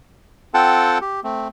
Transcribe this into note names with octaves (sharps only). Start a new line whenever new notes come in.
C4 F4 A4 F#5 G5 A5
G4
A3 C4